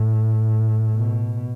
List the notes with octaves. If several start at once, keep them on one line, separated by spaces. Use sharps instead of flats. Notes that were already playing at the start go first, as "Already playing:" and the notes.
Already playing: A2
B2